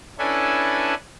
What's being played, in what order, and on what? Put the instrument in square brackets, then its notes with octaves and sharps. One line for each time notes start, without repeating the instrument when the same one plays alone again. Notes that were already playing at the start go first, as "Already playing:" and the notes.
[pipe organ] C#4 D4 E4 A4 B4 G#5